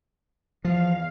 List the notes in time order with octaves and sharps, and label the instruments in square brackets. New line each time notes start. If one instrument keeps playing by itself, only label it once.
[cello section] E2 F5 [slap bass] F3